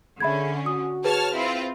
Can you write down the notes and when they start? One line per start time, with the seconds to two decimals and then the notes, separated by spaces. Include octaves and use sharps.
0.20 D3 C#4 G#4 E5 B5 G#6
0.66 F#4 D#6
1.04 G#4 B4 C#5 A5 F6
1.33 C4 E4 F4